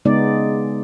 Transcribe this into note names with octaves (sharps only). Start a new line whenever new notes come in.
C#3 G#3 B3 D#4 D5